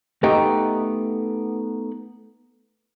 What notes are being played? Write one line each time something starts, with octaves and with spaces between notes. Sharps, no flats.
A3 B3 D#4 G4